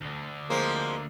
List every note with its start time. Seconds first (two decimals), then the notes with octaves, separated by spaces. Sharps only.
0.01 D2 D3
0.50 F3 G#3 A#3 C4